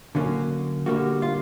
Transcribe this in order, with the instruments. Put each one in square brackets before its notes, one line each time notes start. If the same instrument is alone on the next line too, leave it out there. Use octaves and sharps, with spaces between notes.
[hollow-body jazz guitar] D3 F#3 A#3 C#4
D3 G3 A#3 F#4
F4